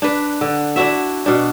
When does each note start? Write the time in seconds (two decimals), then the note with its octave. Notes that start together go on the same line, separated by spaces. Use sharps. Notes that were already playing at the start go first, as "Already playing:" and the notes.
0.02 D4 B4
0.41 D3
0.76 D4 E4 F#4 E5
1.26 B2 D4